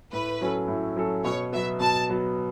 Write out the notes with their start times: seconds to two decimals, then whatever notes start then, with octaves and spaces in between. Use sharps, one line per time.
0.12 A2 B4
0.41 F#3 C#4 A4
0.68 A2
0.96 F#3 C#4 A4
1.24 B2 C#5
1.53 F#3 B3 E5
1.80 B2 A5
2.10 F#3 B3